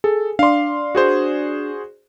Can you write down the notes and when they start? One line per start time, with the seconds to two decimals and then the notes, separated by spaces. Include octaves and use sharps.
0.04 G#4 A4
0.39 D4 D5 F5 C6
0.95 F#4 G#4 C5